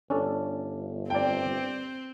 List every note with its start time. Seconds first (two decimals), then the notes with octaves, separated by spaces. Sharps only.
0.10 G1 C#4 D4 A4
1.10 C4 D5 G5